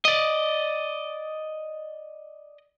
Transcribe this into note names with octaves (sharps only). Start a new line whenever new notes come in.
D5 D#5